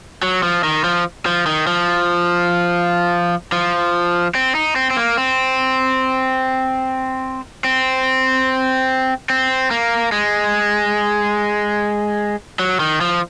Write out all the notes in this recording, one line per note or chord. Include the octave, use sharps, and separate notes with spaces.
F#3
F3
D#3
F3
F3
D#3
F3
F3
C4
D#4
C4
C4
A#3
C4
C4
C4
A#3
G#3
F#3
D#3
F3